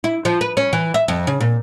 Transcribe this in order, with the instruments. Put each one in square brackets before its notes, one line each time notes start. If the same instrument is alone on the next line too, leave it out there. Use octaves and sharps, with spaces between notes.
[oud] E4
F3
B4
C#4
E3
E5
F2
C#3
A#2